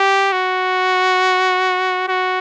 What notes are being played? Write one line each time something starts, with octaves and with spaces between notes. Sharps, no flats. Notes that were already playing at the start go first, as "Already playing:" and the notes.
Already playing: G4
F#4
F#4